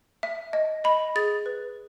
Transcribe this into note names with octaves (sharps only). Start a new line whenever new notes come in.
E5
D#5
D#5 B5
G#4 A6
B4